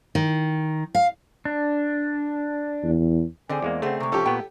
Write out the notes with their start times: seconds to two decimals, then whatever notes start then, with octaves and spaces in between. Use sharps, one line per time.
0.15 D#3
0.95 F5
1.45 D4
2.83 E2
3.49 D3 C4 G#4 C5 D5 G#5
3.62 E2 G#3 A#3
3.82 C#3 A3 C4 G#4 C5 F#5
4.00 C3 G#3 C#6
4.12 C3 F3 C#4 G4 A4
4.26 A#2 B3 G5